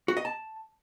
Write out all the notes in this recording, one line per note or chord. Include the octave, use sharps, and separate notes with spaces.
F#4
D#5
A5